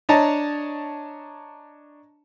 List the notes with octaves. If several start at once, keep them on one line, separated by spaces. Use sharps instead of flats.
D4 C#5 D#5 A5 A#5